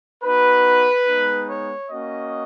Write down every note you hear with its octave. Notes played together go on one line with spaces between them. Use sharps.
B3 D#4 F#4 B4
G#3 B3 D#4
C#5
A#3 C#4 F#4 D#5